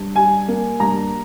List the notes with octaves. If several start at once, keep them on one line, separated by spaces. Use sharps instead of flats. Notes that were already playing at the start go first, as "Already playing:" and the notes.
Already playing: G2
G3 G#5
A#3
G2 A#5